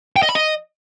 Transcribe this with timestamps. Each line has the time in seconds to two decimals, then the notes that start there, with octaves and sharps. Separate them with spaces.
0.16 G5
0.23 D#5
0.29 B5
0.35 D#5